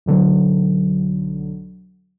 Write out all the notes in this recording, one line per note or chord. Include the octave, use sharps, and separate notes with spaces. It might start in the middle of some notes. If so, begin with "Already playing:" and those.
B1 D3 F#3